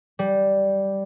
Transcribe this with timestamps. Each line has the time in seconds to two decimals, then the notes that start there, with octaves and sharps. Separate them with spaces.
0.19 G3